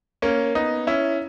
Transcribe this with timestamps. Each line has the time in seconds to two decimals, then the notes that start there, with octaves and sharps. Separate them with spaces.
0.22 A#3 C#4
0.55 B3 D#4
0.87 C#4 E4